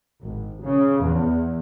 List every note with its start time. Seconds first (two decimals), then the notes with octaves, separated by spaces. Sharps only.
0.22 G#1
0.62 C#3
1.04 E2